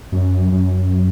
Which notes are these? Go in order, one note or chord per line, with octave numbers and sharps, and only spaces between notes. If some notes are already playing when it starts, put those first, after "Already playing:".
F#2
F#2